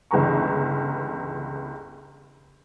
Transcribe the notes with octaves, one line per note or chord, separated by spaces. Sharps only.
G1 C#2 E3 G#4 A#5 C#6